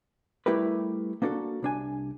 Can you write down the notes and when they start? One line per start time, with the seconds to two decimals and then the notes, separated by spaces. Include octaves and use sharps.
0.46 G3 A3 E4 G4 A#4 B4
1.22 A#3 B3 D4 F#4 A4
1.62 C2 D4 G#5